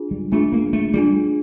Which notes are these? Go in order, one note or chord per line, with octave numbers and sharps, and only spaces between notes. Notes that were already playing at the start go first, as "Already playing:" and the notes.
Already playing: D4 F4 G#4
G3
A3 D4 F4 G#4
A#3
A3
G3 D4 F4 G#4